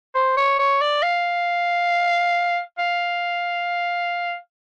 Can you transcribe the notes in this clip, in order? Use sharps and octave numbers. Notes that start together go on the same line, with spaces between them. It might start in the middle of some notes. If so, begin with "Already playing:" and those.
C5
C#5
C#5
D5
F5
F5